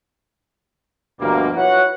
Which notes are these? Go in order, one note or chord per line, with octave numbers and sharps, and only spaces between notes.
D2 G2 B2 F3 G3 A#3
E4 F#4 B4 C#5 F#5